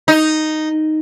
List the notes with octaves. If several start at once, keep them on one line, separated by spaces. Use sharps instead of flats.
D#4